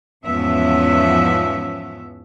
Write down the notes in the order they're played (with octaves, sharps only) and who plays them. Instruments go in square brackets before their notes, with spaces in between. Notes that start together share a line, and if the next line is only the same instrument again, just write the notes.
[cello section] E2 G#2 F3 B3 C#4 E5